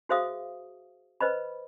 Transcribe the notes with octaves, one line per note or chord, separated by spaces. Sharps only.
F#4 G#4 C5 E5 F5 D#6
B4 C5 D#5 B5